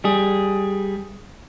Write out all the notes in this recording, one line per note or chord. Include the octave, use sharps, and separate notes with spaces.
G3 G#4